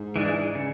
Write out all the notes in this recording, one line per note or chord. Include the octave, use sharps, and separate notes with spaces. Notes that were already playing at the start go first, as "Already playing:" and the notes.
Already playing: G#2
E3 G#3 D4
C#3